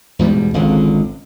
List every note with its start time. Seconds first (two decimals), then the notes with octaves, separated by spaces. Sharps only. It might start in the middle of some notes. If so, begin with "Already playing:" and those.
0.19 E2 G#2 B2 G3
0.54 G#1 C#2 D3